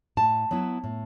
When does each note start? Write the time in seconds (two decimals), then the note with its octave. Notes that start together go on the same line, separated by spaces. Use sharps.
0.17 A2 A5
0.51 F#3 B3 E4
0.84 A2